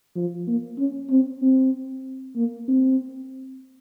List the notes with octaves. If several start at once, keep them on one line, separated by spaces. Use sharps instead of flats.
F3
A#3
C#4
C4
C4
A#3
C4